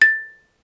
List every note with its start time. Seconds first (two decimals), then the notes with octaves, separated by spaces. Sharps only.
0.02 A6